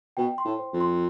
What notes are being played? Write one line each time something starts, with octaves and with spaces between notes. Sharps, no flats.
B2 G5
C6
A2
C5
F2
C6